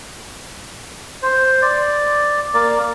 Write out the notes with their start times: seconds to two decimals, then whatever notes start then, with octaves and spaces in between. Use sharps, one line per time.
1.22 C5
1.62 D5
2.54 A#3 D5